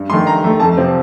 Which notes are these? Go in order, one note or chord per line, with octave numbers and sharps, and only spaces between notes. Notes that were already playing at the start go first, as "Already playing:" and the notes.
Already playing: G2
D#3 A3 C6
G2 A#5
D#3 A3
F2 A5
C3 F3 C4